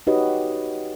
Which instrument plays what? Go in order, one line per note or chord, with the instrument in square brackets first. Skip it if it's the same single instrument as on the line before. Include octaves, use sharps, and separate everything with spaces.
[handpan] D#4 F#4 G4 B4 C#5 D#5